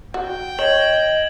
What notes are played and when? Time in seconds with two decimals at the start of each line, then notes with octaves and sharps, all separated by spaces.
0.14 F#4 G5
0.59 C#5 D#5 G#6 E7 F#7